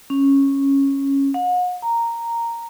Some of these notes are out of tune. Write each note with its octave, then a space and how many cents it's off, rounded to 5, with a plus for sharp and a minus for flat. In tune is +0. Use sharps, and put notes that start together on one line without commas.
C#4 -10
F#5 -40
A#5 -5